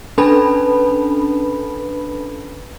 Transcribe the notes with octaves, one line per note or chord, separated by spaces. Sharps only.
C#4 D4 A4 B4 A5 B5